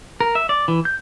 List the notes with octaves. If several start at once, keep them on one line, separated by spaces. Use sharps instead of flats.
A#4
E5
D5
E3
G6